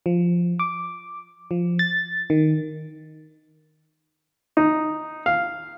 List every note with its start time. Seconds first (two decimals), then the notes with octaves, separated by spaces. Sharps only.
0.06 F3
0.59 D6
1.51 F3
1.79 A6
2.30 D#3
4.57 D#4
5.26 F5